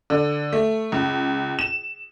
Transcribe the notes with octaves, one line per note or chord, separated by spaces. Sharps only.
D3
A3
C#2
E7